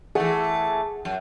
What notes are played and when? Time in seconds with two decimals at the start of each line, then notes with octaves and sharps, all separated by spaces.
0.15 E3 A3 G#4 F#5
1.05 F#2